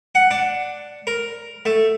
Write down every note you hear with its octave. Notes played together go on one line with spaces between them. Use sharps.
F#5
D4
A#4
A3